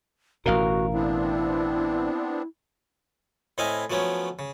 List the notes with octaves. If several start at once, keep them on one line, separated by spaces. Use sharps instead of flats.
A1 B2 F#4 A#4 F5
B3 C4 D4 E4
A2 C4 E4 D#5 F5 G#5
F3 F#3 A3 B3 C#4
C#3